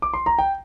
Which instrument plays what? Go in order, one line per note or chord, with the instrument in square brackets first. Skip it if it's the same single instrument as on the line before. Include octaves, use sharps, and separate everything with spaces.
[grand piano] D6
C6
A#5
G5